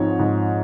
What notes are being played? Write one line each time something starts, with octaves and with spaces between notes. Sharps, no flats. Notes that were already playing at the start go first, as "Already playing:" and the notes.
Already playing: G#2 F3 C4 D#4 C#5
G#2